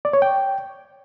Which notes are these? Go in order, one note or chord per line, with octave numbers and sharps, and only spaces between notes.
D5
C#5
G5